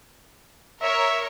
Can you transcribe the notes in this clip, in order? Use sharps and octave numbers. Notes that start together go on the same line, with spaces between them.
A#4 C#5 E5 C#6